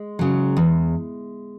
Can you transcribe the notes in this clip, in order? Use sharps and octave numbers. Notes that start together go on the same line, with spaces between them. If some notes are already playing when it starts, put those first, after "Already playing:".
Already playing: G#3
C#3 F#3
E2